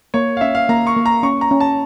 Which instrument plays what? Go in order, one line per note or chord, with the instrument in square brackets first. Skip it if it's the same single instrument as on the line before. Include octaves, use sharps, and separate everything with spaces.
[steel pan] A#3 [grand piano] C#5
[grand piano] F5
[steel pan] C#4 [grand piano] E5
[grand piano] F5
[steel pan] A#3 [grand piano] A#5
[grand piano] C#6
[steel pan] A#3
[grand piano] A#5
[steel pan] C#4 [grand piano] C#6
[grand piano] A#5
[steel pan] C#4
[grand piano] A5